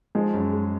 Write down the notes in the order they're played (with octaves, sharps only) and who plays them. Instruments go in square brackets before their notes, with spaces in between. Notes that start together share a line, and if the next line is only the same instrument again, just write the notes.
[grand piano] F3 [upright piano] G#3
[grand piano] F#2
G#3